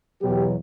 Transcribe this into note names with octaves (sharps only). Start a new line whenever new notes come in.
E2 B2 F#3 G4